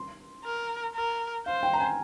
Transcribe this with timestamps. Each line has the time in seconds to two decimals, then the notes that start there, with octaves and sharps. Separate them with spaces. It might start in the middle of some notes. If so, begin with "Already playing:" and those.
Already playing: C6
0.45 A#4
0.95 A#4
1.46 C5 F5
1.63 G5
1.73 A#5
1.80 G#5